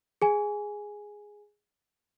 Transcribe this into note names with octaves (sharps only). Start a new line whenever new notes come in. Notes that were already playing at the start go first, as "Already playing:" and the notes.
G#4 G#5